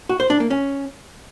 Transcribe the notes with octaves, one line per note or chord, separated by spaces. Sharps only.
F#4
C5
D4
A#3
C#4